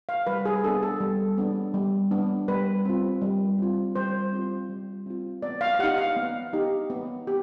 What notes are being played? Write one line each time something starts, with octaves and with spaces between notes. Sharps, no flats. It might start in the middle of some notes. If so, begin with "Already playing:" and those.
F5
G3 B4
G#4
B3 D4 A4
A4
G3
B3 D4
G3
B3 D4
G3 B4
C4 F4
G3
C4 F4
G3 C5
C4 F4
G3
C4 F4
B3 D5
F5
F5
D#4 G4 F#5
F5
B3
D#4 G4
B3
G4